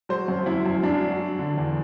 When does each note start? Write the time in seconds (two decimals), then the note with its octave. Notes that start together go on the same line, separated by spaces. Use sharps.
0.09 F#3 C5
0.28 F#2
0.46 F#2 E4
0.66 F#2
0.83 F#2 D4
1.02 F#3
1.20 F#3
1.39 D3
1.58 E2